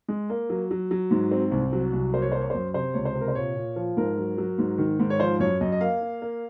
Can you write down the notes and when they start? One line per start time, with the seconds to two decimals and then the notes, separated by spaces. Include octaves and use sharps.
0.08 G#3
0.30 A#3
0.50 F#3
0.71 F#3
0.91 F#3
1.11 G#2
1.31 C4
1.51 C2
1.72 F#3
1.93 C2
2.13 A#3 C5
2.22 C#5
2.32 A#3 C5
2.41 C#5
2.50 F#2 C5
2.74 C3 C5
2.94 C#2 C#5
3.05 C5
3.15 C3
3.21 A#4
3.28 C5
3.35 A#2 C#5
3.56 A#2
3.76 F3
3.97 G#2 A#4
4.17 F#3
4.38 F#3
4.58 G#2
4.78 D#3
4.99 G#2
5.10 C#5
5.20 F3 C5
5.40 F#2 C#5
5.61 F#2 D#5
5.72 D#5
5.81 A#3 F5
6.01 A#3
6.22 A#3